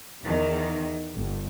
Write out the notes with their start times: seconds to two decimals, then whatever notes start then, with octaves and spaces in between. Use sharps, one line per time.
0.22 E2 D#3
1.15 G1